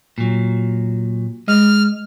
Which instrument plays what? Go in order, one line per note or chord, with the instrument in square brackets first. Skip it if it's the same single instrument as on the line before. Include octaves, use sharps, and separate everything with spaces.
[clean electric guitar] A#2 F#3
[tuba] G#3 [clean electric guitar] D#5 [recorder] F6